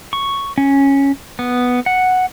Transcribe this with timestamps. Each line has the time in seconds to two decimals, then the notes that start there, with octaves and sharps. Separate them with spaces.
0.13 C#6
0.58 C#4
1.39 B3
1.86 F#5